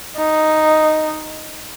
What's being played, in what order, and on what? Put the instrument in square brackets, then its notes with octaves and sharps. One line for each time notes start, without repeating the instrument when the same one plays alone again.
[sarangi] D#4